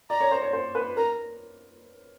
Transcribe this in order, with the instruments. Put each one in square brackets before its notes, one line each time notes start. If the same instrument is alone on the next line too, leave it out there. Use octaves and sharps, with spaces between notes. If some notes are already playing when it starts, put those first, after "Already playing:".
[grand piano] D5 [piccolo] A#5
[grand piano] C#5
C5
C#5
C5
B4
[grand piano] A#4 [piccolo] A#5